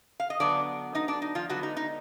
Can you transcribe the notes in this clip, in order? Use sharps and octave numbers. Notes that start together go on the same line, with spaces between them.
F5
D#5
D3 F#3 B3 D4 D5
D#4 D#5
D4 D5
D#4
F3 F4
D3 F#3 G#3 B3 F#4
D#4
D#4